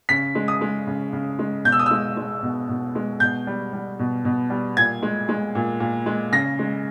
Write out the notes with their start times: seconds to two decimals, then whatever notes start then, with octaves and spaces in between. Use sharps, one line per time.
0.09 C#3 B6
0.35 G#3
0.48 D#6
0.61 G#3
0.87 C#3
1.13 C#3
1.39 G#3
1.64 B2 G6
1.72 E6
1.79 D#6
1.86 G#3 E6
2.17 G#3
2.43 B2
2.69 B2
2.95 G#3
3.20 B2 G6
3.47 G3
3.73 G3
3.99 B2
4.25 B2
4.50 G3
4.77 A#2 G#6
5.02 G#3
5.29 G#3
5.55 A#2
5.80 A#2
6.06 G#3
6.32 C#3 A#6
6.59 G#3